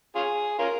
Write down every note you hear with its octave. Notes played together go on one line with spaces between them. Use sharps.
C#4 F4 G#4
C#4 F4 A#4